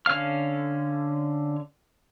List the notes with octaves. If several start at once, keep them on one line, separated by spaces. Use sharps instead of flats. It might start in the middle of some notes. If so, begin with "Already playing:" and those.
D3 C#4 F5 F6